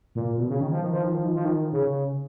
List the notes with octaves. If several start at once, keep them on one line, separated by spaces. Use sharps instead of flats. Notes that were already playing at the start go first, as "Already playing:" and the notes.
A#2
B2
C#3
D#3
F3
D#3
F3
D#3
F3
D#3
F3
D#3
C#3